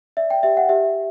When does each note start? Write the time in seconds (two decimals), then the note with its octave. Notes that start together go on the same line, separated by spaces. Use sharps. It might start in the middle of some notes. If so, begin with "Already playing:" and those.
0.17 D5 E5
0.30 G5
0.43 G4 E5
0.57 F#5
0.69 G4 E5